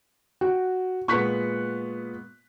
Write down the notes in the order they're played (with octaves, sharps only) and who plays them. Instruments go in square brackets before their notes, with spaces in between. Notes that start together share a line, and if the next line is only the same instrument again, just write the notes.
[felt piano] F#4 [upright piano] G5
[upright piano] A#2 G#3 B3 [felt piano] C#6 F#6 B6